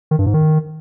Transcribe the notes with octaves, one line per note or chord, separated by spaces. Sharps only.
D#3
G2
G#2
D#3